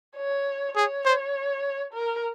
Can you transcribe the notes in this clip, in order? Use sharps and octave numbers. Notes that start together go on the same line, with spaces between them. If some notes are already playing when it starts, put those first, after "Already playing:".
C#5
G#4 C#5
C5
A#4